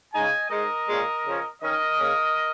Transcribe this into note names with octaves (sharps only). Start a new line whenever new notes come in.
C#3 G#3 D#4 D#5 G#5
G#2 G#3 D#4 A#4 D#5
A#2 G#3 C#4
C#3 F3 C#4
D#3 C#4 A#4 D#5
C#3 A#3 C#4